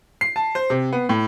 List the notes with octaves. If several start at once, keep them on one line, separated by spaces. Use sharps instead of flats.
C7
A5
C5
C3
B3
A2